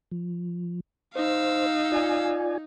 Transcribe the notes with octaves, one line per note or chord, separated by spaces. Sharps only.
F3
D#4 C5 F5 E6
F4 D5 G#5